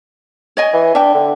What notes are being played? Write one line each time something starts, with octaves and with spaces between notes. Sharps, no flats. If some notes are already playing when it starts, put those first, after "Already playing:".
C#5 D#5 G#5
E3
D4 E5 G5
D3